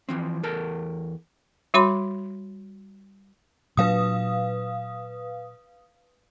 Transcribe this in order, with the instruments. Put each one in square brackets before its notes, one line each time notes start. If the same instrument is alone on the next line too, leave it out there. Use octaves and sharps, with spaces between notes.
[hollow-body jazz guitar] E3 F3 C4
E2 A4 A#4 A5
[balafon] G3 F#4 C#5 B5 C6
[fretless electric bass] A#2 F#3 D4 [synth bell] B4 F5 D#6